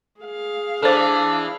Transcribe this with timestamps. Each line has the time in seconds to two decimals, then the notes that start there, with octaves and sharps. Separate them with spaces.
0.21 G#4 F5
0.83 E3 D4 A4 C5